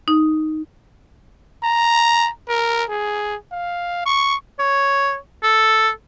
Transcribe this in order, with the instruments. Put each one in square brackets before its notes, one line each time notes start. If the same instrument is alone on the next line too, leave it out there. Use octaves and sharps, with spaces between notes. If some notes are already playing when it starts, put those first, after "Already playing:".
[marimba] D#4
[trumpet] A#5
A#4
G#4
F5
C#6
[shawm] C#5
A4